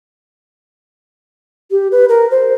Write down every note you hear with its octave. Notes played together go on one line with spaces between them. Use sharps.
G4
B4
A#4
C5